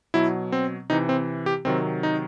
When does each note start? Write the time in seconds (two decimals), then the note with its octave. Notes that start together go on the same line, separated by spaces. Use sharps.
0.14 B2 F#3 E4
0.52 C4
0.90 C3 E3 D#4
1.09 C4
1.46 G4
1.65 C3 D#3 F#3 C4
2.03 D#4